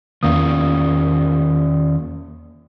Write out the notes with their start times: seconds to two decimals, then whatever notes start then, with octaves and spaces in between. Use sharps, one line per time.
0.23 E2 D#3 A#3 C#4 F4 D#6